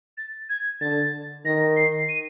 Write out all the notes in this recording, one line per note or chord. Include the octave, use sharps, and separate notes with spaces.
A6
G#6
D3 A6
D#3 A#6
C7
D#7